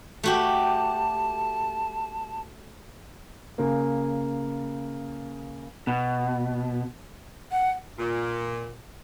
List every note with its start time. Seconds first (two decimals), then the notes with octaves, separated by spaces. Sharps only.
0.23 A3 F#4 G4 A5
3.58 C#3 A#3
5.87 B2
7.52 F#5
7.99 A#2